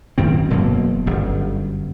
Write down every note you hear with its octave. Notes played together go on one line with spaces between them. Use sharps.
F#2 D#3 C4
E1 B2 F#3 A#3
G1 F#2